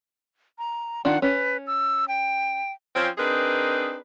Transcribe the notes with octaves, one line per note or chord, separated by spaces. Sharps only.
A#5
D#3 D4 F4 F#5
C#4 B4
E6
G5
F3 C4 C#4
C4 D4 D#4 G#4 A#4 B4